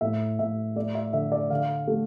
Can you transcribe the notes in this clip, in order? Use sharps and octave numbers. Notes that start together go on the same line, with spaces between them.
A2 E5
A2 E5
A3 D5
E5
D3 E5
D5
D3 F5
A3